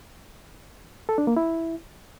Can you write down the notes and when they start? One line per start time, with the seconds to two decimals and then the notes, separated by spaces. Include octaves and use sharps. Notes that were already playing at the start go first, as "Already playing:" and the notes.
1.09 A4
1.18 D4
1.27 A#3
1.36 E4